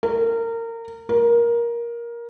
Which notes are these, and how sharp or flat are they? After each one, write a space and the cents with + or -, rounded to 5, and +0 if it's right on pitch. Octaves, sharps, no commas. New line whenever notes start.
A#4 -25
A#4 +15